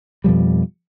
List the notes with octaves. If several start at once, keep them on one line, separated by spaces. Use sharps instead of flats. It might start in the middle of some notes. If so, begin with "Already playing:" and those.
F2 B2 F3 G3